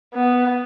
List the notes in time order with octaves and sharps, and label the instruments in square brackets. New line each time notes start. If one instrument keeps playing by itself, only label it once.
[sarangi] B3